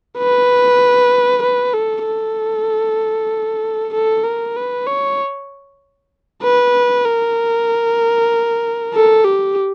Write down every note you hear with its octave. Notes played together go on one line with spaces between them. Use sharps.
B4
B4
A4
A4
A4
A#4
B4
C#5
B4
A#4
A4
G4